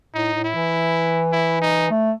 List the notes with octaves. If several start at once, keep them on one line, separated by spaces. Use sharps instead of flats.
A2 D#4
A2
E4
E3
E4
D#4
A3